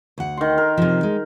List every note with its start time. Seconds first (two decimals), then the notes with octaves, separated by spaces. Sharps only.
0.18 D2 F#5
0.37 D#3 C6
0.58 A#4
0.77 C3 F3
1.03 G#3